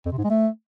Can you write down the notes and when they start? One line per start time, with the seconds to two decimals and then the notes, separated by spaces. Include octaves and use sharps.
0.06 F2
0.12 C3
0.18 G#2
0.24 G#3
0.30 A3